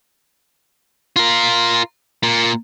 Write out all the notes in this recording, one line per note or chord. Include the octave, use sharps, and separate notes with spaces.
F4 A#4
A#2